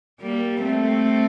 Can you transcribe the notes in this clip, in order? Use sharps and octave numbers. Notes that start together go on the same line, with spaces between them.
G3 A#3
A3 C4